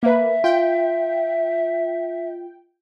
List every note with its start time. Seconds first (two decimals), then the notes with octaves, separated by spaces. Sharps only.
0.03 A#3 B4 E5
0.44 F4 G5